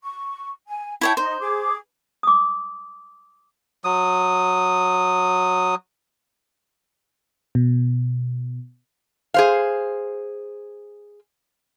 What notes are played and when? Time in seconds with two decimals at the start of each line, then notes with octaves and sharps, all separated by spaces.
0.03 C#6
0.67 G#5
1.01 E4 C#5 G5 A5
1.17 D#4 C5
1.40 G#4 D6
2.23 D6 D#6
3.84 F#3 D#6
7.55 B2
9.34 G#4 C5 F5